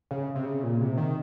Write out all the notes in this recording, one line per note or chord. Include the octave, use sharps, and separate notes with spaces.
C#3
C3
C#3
A#2
C3
D#3